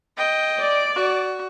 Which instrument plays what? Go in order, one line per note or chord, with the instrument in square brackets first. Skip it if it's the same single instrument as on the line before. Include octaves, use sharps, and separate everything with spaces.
[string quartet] D#5 G5
[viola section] D5
[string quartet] F#4